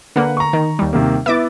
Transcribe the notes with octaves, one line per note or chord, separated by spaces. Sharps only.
D3 A#3 B4 F#5
A#5 C#6
D#3
D#2 G3
C3 D#3 A#3
B3 E4 E5 D6 A6